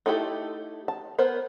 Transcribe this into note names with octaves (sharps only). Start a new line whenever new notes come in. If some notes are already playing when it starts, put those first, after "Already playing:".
A3 D#4 E4 G4 A4
A5
B3 A#4 C5